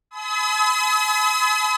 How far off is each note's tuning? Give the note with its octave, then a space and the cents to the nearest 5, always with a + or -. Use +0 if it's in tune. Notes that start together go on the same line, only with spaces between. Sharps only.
G#5 +45 B5 +45 D#6 +45